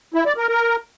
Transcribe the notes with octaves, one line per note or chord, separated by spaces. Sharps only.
E4
D5
A#4
A#4